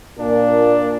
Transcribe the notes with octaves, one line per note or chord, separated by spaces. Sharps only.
A#2 D4